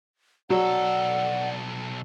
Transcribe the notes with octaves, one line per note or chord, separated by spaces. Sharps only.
B1 F#3 A4 D5 F#5